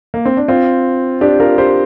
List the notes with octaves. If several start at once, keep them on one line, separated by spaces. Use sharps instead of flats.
A#3
C4
D4
C4 F4
D4 G4
F4 A#4
G4 C5